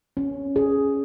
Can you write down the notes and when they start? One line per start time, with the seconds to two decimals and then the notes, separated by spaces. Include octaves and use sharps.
0.17 C#4
0.56 G#4